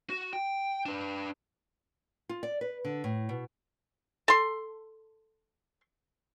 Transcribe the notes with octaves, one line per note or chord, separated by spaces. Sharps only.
F#4
G5
D4 B4
F4
D5
B4
D3
A2
B2
A4 C6